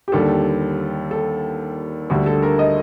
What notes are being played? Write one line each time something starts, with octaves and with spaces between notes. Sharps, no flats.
G4
D#2 D3 G3 A4
A4
D2 D3 G3
A4
A#4
D#5